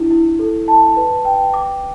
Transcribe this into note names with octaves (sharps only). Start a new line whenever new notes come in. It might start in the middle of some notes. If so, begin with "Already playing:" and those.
Already playing: D4 E4
E4
A4
A5
B4
G5
D6